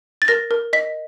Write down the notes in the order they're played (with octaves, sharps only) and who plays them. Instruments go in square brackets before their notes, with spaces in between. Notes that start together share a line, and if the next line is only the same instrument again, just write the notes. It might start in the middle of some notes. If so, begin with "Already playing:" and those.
[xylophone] A6
A#4 A#6
A#4
D#5 B6